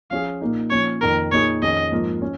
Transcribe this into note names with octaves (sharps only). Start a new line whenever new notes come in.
F3 C#4 F4 G#4 F5
A#2 A#3 D#4
A#2 F3 C#4 C#5
F2 D#3 A#3 A#4
A#2 A#3 D#4 G#4 C#5
F2 D#3 C#4 G#4 D#5
G#2 F3 A#3
C#4